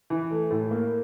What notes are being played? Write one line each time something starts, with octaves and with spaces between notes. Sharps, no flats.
E3
A3
A2
A#3